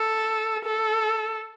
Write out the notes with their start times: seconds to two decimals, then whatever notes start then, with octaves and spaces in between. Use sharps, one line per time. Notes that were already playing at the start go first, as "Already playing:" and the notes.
Already playing: A4
0.65 A4